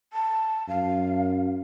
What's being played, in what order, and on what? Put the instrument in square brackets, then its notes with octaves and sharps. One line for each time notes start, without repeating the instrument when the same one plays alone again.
[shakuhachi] A5
[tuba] F#2 [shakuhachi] F5